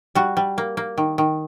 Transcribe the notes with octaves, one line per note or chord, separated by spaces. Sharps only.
G3 F#4
G3
A#3
A#3
D#3
D#3